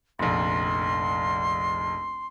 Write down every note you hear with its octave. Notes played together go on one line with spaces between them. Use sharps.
F1 A#1 C6